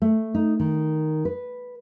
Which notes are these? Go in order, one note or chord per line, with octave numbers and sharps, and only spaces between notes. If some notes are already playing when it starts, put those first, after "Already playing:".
A3
D#4
D#3
B4